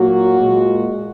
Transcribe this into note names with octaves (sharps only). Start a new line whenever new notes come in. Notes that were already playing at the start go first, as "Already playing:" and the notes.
Already playing: A#2 F#3 A#3 F#4
A#2 G#3